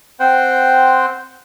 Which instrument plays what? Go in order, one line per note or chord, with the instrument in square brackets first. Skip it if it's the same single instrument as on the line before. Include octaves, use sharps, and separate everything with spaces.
[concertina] C4 C5 F#5 G5